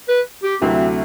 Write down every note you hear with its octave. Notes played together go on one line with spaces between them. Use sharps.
B4
G4
D2 C3 F#3 A3 C4 E4